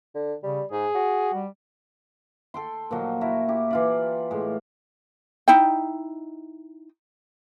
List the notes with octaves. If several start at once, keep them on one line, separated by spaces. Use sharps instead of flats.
D3
C#3 G3
G#2 G#4
F#4
G3
A4 G5 C6
A#2 D#3 F3 F#3
E4 F#4 A#4 E5
E4 G4
E3 F4 D5
A2 G#3
D#4 E4 G5